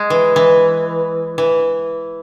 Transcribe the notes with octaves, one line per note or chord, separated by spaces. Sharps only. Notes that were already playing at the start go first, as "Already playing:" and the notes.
Already playing: G#3
E3
E3
E3